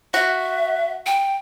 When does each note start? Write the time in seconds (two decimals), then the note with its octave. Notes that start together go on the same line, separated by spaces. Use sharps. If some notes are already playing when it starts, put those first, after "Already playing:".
0.14 F#4 E5
1.06 G5